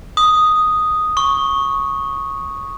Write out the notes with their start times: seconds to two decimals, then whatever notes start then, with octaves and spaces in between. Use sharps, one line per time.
0.17 D#6
1.17 C#6